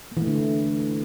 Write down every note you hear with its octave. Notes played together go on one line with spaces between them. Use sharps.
A#3
E3
A3
D3